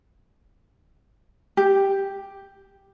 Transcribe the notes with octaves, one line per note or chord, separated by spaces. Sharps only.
G4